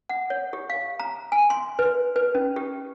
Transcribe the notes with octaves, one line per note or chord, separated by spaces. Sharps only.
F#5
C#5
G4
F5
A#5
G#5
C6
B4
B4
C#4
G4